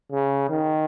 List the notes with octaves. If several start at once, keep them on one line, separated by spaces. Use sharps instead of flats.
C#3
D#3